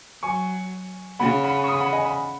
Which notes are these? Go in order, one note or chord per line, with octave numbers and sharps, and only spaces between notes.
F#3 G#5 C#6
C#3 F#5 B5
F#5 B5
C#6
B5 D#6
F#5 B5
D#5 G#5
F#5 B5